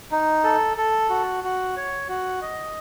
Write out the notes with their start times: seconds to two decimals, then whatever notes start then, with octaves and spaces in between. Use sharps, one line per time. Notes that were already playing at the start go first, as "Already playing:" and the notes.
0.11 D#4
0.44 A4
0.77 A4
1.10 F#4
1.44 F#4
1.76 C#5
2.09 F#4
2.42 D#5